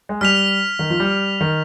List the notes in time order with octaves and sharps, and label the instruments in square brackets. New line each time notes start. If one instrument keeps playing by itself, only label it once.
[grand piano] G#3
[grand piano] G3 [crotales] F6 B6 F7
[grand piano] D#3
F3
G3
D#3